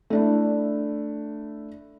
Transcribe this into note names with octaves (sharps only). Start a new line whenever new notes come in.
A3 D4 E4